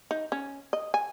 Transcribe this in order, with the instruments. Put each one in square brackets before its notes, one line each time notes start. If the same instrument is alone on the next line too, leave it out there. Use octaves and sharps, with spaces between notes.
[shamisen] D#4
C#4
D#5
G#5